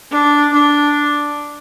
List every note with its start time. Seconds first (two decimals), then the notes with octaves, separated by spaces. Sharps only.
0.11 D4
0.54 D4